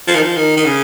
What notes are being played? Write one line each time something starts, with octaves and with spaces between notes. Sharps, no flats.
F3
D#3
F3
D#3
D#3
C#3